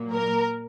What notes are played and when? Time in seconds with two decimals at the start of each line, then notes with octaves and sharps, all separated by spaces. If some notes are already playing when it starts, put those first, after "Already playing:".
Already playing: A#2 F#3 A#3
0.13 A#4